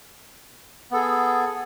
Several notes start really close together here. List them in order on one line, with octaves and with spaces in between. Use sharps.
B3 A4 G#4